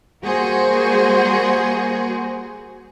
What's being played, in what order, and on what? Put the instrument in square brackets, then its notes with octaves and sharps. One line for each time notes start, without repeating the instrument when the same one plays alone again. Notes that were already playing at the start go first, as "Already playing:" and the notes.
[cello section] G3 A#3 F#4 G#4 C5